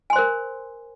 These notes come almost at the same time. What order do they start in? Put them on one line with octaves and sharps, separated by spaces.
G#5 C6 C5 A#4